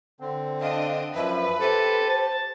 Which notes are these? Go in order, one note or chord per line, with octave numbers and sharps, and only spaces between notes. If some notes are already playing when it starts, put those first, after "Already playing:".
D3 C4
D4 D#5 F5
F#2 F3 B4 E5
G4 A4 C5
A5